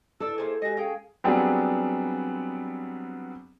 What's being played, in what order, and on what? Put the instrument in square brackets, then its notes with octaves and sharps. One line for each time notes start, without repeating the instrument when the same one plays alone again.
[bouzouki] D4 D5 [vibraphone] E4 [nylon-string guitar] A4 [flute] E6
[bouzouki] A3 A#3 G#4 [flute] C5
[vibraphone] G#3 G4 G#5 [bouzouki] F#4 D#5 [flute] A#6
[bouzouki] C#4 G5 [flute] G#4 [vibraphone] F5
[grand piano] F#3 G3 B3 C4 D4 G#4